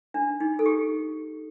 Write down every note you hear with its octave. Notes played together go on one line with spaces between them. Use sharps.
D4
D#4
A4
G4